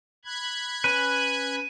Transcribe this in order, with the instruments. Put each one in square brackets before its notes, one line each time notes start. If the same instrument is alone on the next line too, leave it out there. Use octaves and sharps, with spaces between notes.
[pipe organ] B5 F#6 G#6
[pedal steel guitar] C#4 B4 [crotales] D#7